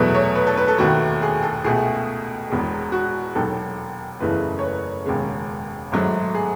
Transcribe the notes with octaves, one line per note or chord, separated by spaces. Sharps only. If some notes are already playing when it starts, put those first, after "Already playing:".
Already playing: E2 B2 F#3 A3 B4
C#5
B4
A4
B4
A4
E1 D#2 D#3 A3 F#4
G#4
A4
C#2 B2 A3 G#4
E1 E2 B2 G#3
F#4
E1 D#2 D#3 F#3 A4
F#1 E2 C#3 E3 A3 B4
C#5
B4
E1 D#2 C#3 G#3
G#1 G#2 F#3 A3
G#4